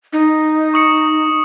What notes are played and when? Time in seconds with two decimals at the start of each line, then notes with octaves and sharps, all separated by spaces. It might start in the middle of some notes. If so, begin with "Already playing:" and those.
0.13 D#4
0.74 C#6 D#6 C#7